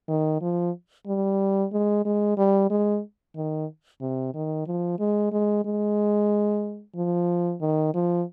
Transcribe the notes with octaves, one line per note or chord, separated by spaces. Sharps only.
D#3
F3
G3
G#3
G#3
G3
G#3
D#3
C3
D#3
F3
G#3
G#3
G#3
F3
D#3
F3